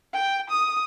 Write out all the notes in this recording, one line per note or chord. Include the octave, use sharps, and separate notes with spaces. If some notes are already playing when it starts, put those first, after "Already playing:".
G5
D#6